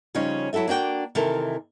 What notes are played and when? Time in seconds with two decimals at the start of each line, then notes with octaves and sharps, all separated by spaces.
0.15 C#3 F3 G3 C#4 D#4
0.53 F#3 E4 F#4 A4 E5
0.68 A#3 D4 F#4 G5
1.15 C3 D#3 E3 A4 A#4